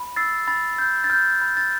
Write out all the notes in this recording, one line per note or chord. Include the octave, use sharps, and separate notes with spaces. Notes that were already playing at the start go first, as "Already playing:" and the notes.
Already playing: B5
E6 A6 C7
B5 A6
G6
A6
F6 G6
B5
A6